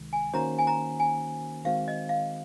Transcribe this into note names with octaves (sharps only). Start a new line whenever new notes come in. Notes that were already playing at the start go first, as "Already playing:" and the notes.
Already playing: C#2 C3 D#3 G#3
G#5
D#3 A#3 C#4 F#4 C5 A#5
G#5
A#5
G#5
D#3 G#3 C4 F#4 C5 F5
D#5
F5